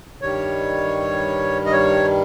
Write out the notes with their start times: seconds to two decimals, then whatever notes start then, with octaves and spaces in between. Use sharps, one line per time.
0.22 G2 D#3 G3 C#5
1.66 D#5
1.72 C#5